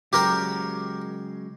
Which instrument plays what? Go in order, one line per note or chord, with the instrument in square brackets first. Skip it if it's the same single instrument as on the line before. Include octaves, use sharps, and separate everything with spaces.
[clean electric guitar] C#3 F#3 G#3 [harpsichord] G4 A#4 G5